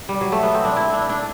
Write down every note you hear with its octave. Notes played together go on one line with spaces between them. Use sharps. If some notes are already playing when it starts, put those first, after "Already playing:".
G3
F#3
A3
B3
C4
D4
E4
D4
D4